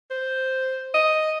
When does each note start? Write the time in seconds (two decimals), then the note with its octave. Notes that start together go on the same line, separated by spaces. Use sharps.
0.11 C5
0.94 D#5